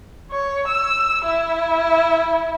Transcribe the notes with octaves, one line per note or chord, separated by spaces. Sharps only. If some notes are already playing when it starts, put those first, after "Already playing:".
C#5
E6
E4